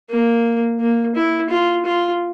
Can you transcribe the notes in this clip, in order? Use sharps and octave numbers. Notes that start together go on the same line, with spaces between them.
A#3
A#3
E4
F4
F4